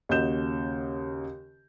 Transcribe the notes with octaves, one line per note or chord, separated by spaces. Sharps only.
D#2 C#3 F#4 D#5 G6 E7